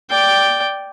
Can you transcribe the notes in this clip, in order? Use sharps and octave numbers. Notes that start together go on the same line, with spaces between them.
D5 G5